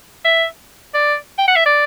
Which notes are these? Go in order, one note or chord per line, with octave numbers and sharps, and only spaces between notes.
E5
D5
G5
F#5
E5
D5